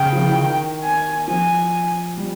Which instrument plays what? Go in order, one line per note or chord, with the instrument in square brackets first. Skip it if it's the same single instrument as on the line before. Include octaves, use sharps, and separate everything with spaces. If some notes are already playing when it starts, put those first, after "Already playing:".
Already playing: [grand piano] C#3 [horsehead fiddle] G5
[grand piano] F3
E3
D#3
[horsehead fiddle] G#5
[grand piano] F3 [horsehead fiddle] G#5
[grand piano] G3